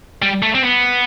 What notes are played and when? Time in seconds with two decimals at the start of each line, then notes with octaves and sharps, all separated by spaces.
0.22 G3
0.43 A3
0.55 C4
0.63 B3